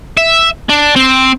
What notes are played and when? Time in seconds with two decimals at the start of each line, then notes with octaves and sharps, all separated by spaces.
0.17 E5
0.69 D4
0.96 C4